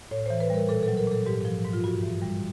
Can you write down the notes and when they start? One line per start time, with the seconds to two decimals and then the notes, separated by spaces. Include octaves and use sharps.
0.11 A2 C#5
0.26 E3 C5
0.40 B4
0.50 G3 A#4
0.69 A#2 A4
0.83 F#3 A4
0.97 A#4
1.07 A#2 A4
1.26 G#2 G4
1.45 F3
1.64 G#2
1.73 F4
1.84 G2 F#4
2.03 E3
2.22 G3